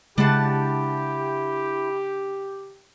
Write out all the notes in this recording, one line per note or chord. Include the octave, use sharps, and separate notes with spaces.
C#3 G#3 D4 E4 G4 F#5 A5